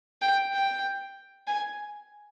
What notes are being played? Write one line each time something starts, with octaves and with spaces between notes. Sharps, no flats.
G5
G5
G#5